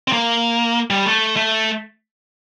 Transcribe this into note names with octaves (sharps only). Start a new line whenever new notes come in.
C4
A#3
G3
A3
A3